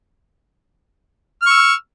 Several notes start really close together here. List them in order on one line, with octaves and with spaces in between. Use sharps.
F6 C#6 E6